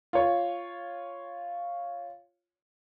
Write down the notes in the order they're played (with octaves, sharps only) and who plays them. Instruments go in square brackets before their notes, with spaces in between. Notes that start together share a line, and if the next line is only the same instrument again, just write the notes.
[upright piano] F4 C#5